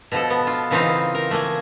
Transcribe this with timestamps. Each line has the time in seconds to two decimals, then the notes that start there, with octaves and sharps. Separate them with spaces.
0.12 B2 F3 A4
0.30 B3
0.47 F4
0.71 C#3 E3 C4 D#4 F4 F5
1.15 A#4
1.30 A3 A#3 G#5